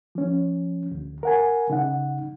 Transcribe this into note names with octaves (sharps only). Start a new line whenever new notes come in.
F3 C#4
D2
A#4 F#5 G#5
C#3 D#4 F#5